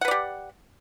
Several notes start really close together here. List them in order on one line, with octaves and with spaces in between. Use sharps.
F#5 B4 D5 G4